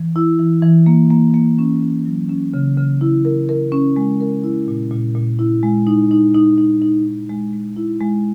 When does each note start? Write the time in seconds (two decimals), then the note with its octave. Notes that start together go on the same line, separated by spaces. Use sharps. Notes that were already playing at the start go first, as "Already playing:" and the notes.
Already playing: E3
0.16 E4
0.40 E3
0.63 E3
0.86 A#3
1.10 A#3
1.34 A#3
1.59 C#4
1.82 C#4
2.05 F#3
2.29 C#4
2.54 C#3
2.77 C#3
3.01 E4
3.25 A#4
3.49 A#4
3.72 C#4
3.96 G#3
4.21 A#4
4.44 E4
4.68 A#2
4.91 A#2
5.15 A#2
5.39 E4
5.63 G#3
5.87 D#4
6.11 D#4
6.34 D#4
6.58 D#4
6.82 D#4
7.06 D#4
7.29 G#3
7.53 G#3
7.76 E4
8.01 G#3